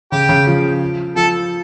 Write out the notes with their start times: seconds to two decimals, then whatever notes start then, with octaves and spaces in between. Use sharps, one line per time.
0.12 C#3 G4
0.29 C#3
0.47 F3
1.16 F3 A4